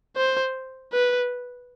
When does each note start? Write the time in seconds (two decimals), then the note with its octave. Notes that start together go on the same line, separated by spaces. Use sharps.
0.17 C5
0.93 B4